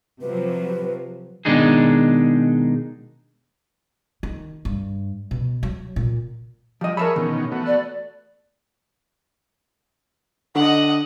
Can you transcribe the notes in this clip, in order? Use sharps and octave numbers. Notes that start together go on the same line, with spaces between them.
C3 F3 F#3 B4
B2 D#3 G#3 D4 D#4 G#4
D#3
G2
B2
F#3
A#2
F3 G3 D#5
G#4 A#4 C#5 E5 A5 B5
B2 D#3 E3 C#4
A3 B3 F#4
D5
D3 D#5 F#5